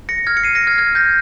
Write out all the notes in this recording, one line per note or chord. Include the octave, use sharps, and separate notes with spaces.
A#6 C#7
F6 G#6
C#7
C7 D#7
A#6 C#7
F6 G#6
F6 G#6
G6 A#6